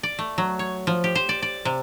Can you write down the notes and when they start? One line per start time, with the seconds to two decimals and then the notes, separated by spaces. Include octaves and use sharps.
0.03 D5
0.19 A3
0.38 F#3
0.59 C#5
0.87 F3
1.04 G4
1.15 C5
1.29 D5
1.42 D5
1.65 C3